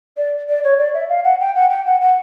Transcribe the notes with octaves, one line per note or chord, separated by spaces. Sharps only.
D5
D5
C#5
D5
E5
F5
F#5
G5
F#5
G5
F#5
F#5